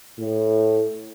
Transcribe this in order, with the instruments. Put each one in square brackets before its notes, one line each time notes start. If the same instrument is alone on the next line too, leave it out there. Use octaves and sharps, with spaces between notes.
[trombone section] A2